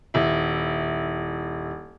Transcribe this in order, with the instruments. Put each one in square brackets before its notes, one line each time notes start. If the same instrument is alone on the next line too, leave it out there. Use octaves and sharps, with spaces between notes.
[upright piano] D#1 E4